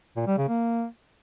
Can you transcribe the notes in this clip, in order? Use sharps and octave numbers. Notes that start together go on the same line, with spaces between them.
A#2
G3
C#3
A#3